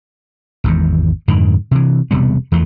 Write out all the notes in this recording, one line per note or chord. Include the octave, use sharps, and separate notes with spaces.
G#1 E2 G#2
F2 G#2 D3 D#3
C3 E3
E1 C3 G3 B3
E2 E3 F3 A3